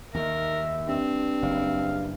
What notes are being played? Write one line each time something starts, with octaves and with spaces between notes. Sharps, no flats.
D#2 D#3 A#4 E5
G2 C4
F#1 F5